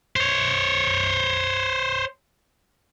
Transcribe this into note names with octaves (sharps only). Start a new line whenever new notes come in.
C5 C#5